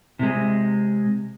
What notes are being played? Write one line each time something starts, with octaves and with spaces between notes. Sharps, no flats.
C3 G#3